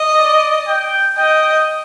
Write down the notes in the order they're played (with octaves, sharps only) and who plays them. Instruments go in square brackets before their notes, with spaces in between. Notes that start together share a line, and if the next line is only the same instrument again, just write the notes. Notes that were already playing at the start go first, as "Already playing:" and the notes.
Already playing: [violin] D#5
[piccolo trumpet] D5
G5
[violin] D#5 [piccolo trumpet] G5